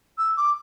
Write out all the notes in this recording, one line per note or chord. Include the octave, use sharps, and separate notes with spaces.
E6
D6